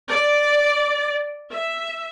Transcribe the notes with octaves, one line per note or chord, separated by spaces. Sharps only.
D5
E5